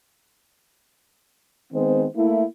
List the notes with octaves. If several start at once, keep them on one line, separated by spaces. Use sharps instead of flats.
D#3 G#3 B3 C4 C5
A3 A#3 E4